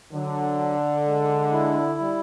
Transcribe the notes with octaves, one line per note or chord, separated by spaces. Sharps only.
D3 F#3
D4
G#3
E4
G3